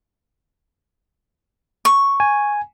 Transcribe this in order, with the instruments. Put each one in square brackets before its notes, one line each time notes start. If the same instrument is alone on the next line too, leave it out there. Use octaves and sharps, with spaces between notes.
[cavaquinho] C#6
[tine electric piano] G#5